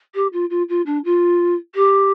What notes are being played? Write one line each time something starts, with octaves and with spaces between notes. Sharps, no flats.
G4
F4
F4
F4
D4
F4
G4